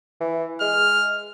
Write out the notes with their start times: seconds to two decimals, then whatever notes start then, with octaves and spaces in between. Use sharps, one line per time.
0.21 E3
0.61 G#3 F6